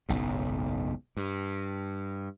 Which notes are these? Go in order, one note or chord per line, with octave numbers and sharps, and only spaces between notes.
F#1 B1 G#2
G2